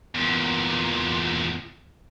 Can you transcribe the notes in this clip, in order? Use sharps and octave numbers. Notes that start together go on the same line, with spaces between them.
E2 A#2